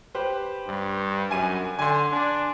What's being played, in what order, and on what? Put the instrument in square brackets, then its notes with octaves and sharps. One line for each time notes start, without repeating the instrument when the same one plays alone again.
[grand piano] G4 B4 C5
[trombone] G2
[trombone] F#2 [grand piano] G#5 D#7
[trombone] D3 [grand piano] G#5 C6
[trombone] D4